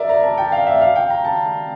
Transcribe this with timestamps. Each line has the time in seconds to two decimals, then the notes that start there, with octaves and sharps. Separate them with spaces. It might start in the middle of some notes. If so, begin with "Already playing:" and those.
Already playing: A#4 D5 E5
0.09 A#5
0.23 A5
0.38 G5
0.52 F5
0.67 E5
0.81 F5
0.96 G5
1.10 A#5
1.25 A5